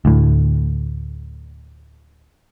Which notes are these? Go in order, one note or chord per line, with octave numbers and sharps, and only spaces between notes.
D2 A2